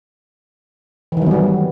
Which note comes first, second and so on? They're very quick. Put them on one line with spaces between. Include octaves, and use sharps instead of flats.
E3 D#3 F#3 B3 G3